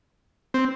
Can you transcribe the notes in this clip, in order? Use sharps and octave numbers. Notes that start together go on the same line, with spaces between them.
C4